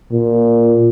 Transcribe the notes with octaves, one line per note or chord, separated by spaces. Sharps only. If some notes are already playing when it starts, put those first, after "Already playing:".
A#2